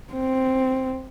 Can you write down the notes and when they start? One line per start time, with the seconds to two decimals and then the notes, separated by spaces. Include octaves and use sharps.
0.13 C4